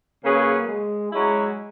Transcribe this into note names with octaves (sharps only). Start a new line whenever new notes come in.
C#3 F#3 A#3 C#4 G#4 B4
G#3
F#3 G#3 C#4 E4